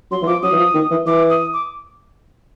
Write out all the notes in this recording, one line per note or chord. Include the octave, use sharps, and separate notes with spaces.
F#3 C6
E3
F3 D6
F#3 D#6
E3
F3
D#3
E3
E3 D6
D#6
D6